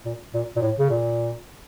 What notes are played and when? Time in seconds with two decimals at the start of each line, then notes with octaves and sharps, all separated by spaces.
0.05 A#2
0.34 A#2
0.56 A#2
0.62 A2
0.79 C#3
0.90 A#2